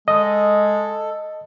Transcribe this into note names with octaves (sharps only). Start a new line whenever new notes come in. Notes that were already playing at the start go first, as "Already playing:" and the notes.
G#3 A4 D#5